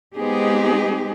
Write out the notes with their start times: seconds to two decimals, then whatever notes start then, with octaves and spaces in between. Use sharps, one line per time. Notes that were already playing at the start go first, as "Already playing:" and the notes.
0.15 G#3 B3 C4 D#4 G4 G#4